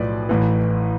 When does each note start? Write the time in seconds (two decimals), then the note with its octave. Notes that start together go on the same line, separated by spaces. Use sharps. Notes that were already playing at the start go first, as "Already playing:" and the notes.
Already playing: B1 A2 F3 B4 D5
0.29 A1 A2 E3